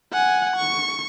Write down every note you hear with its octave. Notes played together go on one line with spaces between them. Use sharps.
F#5 G#5
C#6